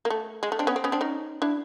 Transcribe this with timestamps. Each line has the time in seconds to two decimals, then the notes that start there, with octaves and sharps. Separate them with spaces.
0.05 A#3
0.10 A3
0.43 G#3
0.52 A3
0.59 C4 D4
0.67 B3 C#4
0.76 C4
0.84 B3 C#4
0.92 C4 D4
1.01 C#4 D#4
1.42 D4 E4